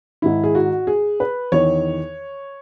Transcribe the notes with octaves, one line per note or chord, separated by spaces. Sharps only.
G#2 D#3 E4
G#4
F#4
G#4
B4
E2 D#3 C#5